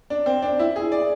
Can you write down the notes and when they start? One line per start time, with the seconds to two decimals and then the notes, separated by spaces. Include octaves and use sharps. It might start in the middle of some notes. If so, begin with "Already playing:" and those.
0.10 D4
0.26 C4
0.42 D4
0.59 E4
0.76 G#4
0.92 D5